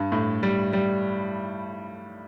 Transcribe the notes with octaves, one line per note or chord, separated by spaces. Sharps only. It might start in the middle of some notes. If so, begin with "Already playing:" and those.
Already playing: G2
A2
G3
G3